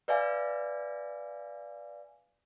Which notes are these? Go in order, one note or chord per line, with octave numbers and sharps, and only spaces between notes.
B4 D5 E5 F5 G#5